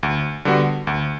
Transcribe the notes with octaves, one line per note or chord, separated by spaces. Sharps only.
D2
D3 G3 B3 F#4
D2